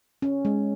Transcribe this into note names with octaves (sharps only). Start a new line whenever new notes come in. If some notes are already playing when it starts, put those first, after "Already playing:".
C#4
G#3